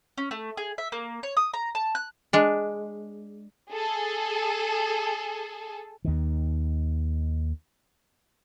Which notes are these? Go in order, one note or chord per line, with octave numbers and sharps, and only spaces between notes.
C#4
A3
G#4
E5
A#3
C#5
D#6
A#5
A5
F#6
G#3 D4
G#4 A4
D#2 D#3